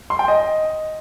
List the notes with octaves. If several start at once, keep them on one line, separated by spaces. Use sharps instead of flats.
C6
G5
D#5